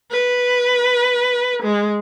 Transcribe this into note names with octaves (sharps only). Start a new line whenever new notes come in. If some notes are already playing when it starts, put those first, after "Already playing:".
B4
G#3